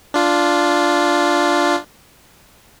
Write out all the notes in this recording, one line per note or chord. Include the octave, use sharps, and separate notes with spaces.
D4 F4